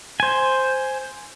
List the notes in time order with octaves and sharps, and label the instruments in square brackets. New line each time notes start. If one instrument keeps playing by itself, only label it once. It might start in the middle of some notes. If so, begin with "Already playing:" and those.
[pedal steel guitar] C5 G#5